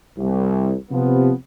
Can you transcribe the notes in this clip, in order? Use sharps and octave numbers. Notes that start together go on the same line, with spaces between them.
C2
C3 F3 B3